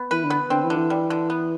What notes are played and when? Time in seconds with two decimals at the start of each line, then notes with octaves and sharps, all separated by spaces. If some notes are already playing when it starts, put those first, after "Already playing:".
Already playing: B3
0.11 E3 B4
0.24 D3
0.30 B3
0.50 D3 C4
0.63 E3
0.70 D3
0.76 E3
0.90 G3
1.10 D3
1.30 B3